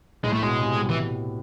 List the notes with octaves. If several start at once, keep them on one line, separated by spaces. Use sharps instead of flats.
A2 G#3
A3
B2 G#3
C3
E3